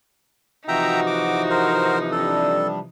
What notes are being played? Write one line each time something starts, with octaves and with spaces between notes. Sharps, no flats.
C3 E3 F3 D#4 F#4 E5 G5 A#5
D6
A#4 C5
G3 D4 A4